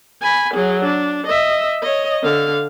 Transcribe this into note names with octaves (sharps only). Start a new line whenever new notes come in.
G#5 B5
F#3 G#4
D4
D#5 E5
C#5 D#5
D3 F5